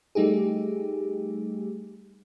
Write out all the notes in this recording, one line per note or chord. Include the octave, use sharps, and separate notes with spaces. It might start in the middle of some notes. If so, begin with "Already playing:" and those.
G3 A3 D#4 G4 G#4